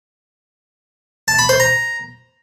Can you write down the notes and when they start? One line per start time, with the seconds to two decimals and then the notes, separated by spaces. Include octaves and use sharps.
1.28 A5
1.39 B5
1.49 C5
1.60 A#5